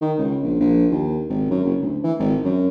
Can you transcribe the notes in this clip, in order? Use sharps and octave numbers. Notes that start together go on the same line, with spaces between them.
D#3
C#2
A#1
A#1
D#2
G#1
F#2
F#1
D2
E3
G#1
F#2